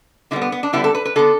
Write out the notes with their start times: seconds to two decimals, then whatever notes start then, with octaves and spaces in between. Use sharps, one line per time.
0.31 D3 G3 B3 E4
0.41 B3
0.52 B3
0.63 D4
0.73 D3 G3 B3 E4
0.84 A4
0.95 B4
1.05 B4
1.16 D3 B3 A4